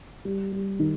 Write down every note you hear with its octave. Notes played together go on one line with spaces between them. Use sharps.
G3
G3
D#3